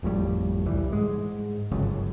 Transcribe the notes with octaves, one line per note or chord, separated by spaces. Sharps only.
G#1 F2 A2 G3
D1 C2 E3 G3
G#2 G#3
G1 C#2 F#2